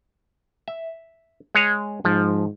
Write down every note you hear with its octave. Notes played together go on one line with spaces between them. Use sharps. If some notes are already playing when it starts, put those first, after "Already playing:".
E5
G#3 G#4 C#5
G#2 F3